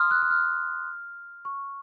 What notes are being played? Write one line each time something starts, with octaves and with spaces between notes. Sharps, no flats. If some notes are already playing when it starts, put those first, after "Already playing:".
Already playing: C6 D#6 F6
F#6
F#6
F6
C#6